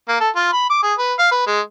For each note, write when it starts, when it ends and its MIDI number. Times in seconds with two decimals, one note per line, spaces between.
0.08 0.16 58
0.20 0.30 69
0.36 0.52 65
0.53 0.67 83
0.70 0.81 86
0.83 0.93 68
0.98 1.13 71
1.19 1.28 77
1.31 1.43 71
1.47 1.60 56